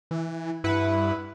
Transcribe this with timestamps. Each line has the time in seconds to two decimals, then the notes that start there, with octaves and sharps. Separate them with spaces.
0.11 E3
0.64 G2 E4 B4 F#5